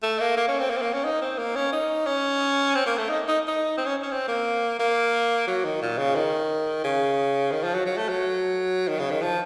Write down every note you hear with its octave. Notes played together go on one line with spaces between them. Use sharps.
A3
A#3
A#3
C#4
C4
A#3
C4
A#3
C#4
D#4
C4
A#3
C#4
D#4
C#4
C4
A#3
A3
D#4
D#4
D#4
C4
C#4
C#4
C4
A#3
A#3
F#3
D#3
A#2
C#3
D#3
C#3
D#3
F3
F#3
F#3
A3
F#3
D#3
C#3
D#3
F3